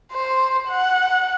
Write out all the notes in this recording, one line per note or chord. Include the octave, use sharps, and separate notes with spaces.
C5
F#5